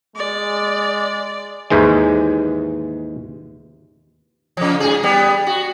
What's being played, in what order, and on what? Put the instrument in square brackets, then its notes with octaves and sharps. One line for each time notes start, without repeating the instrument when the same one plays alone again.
[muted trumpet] G#3 [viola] D5
[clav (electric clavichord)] D#2 G#2 E3 G#3
[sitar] C#3 F3
G#2 G#4
G3 B3
F#4